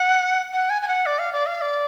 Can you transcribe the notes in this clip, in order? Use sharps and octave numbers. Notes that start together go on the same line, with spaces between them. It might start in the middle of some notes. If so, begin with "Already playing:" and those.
Already playing: F#5
F#5
G#5
G#5
F#5
D5
F5
D5
F5
D5